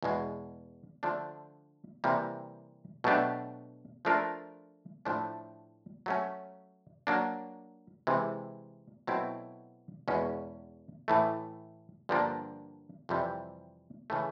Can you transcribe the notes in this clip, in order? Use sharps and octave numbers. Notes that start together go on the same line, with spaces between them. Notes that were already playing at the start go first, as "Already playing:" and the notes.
E2 B2 G#3
D3 F3 A3 D4
C3 E3 G3 A#3
B2 F#3 A3 D4 G4
F3 A3 D4 F4 A#4
A2 F3 A3 D4
F#3 A3 C#4
F#3 A#3 D4
C3 E3 G#3
B2 F#3 A3 C4 E4
E2 B2 G#3 C#4
A2 E3 A3
G2 D3 F3 A#3 D4
F2 C3 E3 G3
C#3 E3 A3